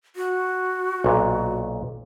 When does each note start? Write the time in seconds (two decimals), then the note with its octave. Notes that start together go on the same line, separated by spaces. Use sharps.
0.16 F#4
1.04 B1 A#2